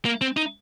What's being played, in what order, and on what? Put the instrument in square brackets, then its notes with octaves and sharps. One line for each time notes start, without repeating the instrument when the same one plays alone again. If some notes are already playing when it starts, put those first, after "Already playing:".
[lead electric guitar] A#3
C4
D#4